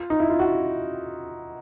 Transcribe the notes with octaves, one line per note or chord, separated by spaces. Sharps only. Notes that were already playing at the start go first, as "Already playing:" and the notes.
Already playing: F4
D#4
E4
F4
F#4